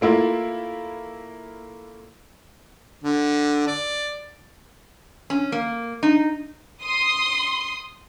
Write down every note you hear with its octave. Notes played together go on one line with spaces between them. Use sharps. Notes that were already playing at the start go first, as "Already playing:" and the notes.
A3 A#3 E4 F4
D3
D5
C#4
A#3
D#4
C6 D#6